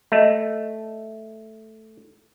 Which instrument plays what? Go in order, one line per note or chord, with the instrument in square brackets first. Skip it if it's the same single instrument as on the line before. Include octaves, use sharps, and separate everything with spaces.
[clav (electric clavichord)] A3 [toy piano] D#5 E5